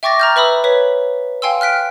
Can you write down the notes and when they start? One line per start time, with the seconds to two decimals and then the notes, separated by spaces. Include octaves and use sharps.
0.03 E5 G5 C#6 D6 A6 A#6
0.20 A#5 F6 G6
0.36 B4 E5 B5 D#6 E6
0.64 B4 C#5 B6
1.42 F5 G5 G#5 C6 E6
1.61 F6 F#6 B6 D7